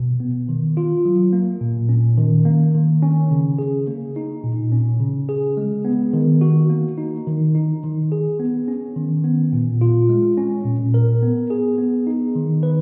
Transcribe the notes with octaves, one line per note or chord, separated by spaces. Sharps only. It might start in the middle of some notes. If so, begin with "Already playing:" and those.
Already playing: B2
B3
D#3
F4
F#3
A#3
A#2
C#4
D#3
A#3
D#3
C#4
C#3
G#4
A#3
D#4
A#2
C#4
C#3
G#4
G#3
B3
D#3
F#4
A#3
D#4
D#3
D#4
D#3
G#4
B3
C#4
D#3
B3
A#2
F4
G#3
C#4
A#2
A#4
B3
G#4
B3
D#4
D#3
B4